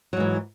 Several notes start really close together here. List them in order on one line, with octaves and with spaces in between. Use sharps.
F#3 G#2 E3